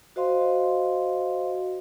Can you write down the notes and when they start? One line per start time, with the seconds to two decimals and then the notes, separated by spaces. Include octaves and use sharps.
0.16 F#4 C5 D#5 F5 C6